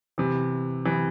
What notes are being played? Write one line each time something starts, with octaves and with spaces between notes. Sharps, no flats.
C3 E3
C3 E3